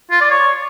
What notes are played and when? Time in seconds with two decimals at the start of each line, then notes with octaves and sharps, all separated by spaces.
0.11 F4
0.21 D5
0.31 C#5